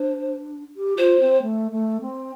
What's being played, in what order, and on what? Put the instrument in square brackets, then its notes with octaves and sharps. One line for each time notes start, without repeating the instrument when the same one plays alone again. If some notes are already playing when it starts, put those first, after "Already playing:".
Already playing: [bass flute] D4 [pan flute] C5
[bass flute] G4
[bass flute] F4 [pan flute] C5
[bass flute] C4
A3
A3
C4